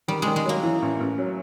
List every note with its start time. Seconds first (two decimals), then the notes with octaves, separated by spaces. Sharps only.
0.08 D#3 G3
0.22 D#3 G#3
0.36 G#3
0.45 F#3 A#3
0.63 E3
0.82 A1
1.00 A1
1.18 F#3